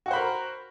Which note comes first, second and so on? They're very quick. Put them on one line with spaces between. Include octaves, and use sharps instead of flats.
F#4 F#5 C5 B5 A#4